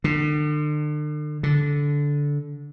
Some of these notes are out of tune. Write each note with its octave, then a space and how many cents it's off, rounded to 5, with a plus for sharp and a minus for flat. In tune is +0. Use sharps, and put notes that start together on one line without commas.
D3 +40
D3 -15